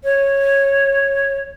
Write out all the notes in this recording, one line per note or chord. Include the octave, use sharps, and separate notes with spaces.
C#5